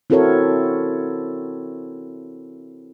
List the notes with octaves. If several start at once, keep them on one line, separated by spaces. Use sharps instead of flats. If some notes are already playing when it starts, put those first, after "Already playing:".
C4 E4 F#4 A4 A#4 C#5